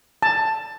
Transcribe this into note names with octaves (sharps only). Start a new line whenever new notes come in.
A5